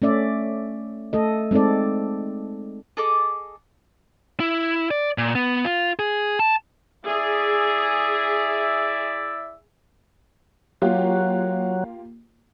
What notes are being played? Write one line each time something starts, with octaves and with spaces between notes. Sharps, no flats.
A3 C#4 D5 E5
A3 A4 D#5
G#3 C4 D#4 A4 D5
G#4 A4 D#5 D6
E4
D5
A#2
B3
F4
G#4
A5
E4 G#4 D5 E5
F#3 A#3 F4 G4